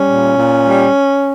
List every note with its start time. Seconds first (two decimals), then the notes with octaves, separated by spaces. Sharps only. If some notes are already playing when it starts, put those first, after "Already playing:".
Already playing: G3 C#4
0.10 A#2
0.36 A#2
0.64 G3